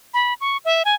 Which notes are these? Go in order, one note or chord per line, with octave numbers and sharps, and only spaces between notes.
B5
C#6
E5
G#5